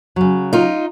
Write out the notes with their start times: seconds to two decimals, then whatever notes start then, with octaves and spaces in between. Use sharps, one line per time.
0.16 C#3 F#3
0.53 D#4 F4